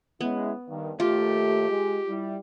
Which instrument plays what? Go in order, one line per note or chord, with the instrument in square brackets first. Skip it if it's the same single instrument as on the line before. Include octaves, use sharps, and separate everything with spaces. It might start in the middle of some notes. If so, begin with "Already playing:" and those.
[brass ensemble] G#3 C#4 E4 [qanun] B3
[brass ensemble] G2 D#3
[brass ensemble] D#2 A3 [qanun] F4 [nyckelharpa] G4
[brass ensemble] G#3
G3 E4